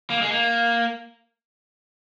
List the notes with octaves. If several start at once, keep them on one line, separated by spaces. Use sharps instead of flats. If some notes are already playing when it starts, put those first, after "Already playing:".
A#3
G#3
A#3